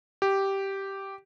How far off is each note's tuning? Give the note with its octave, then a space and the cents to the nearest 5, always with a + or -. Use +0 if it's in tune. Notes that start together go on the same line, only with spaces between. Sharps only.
G4 -5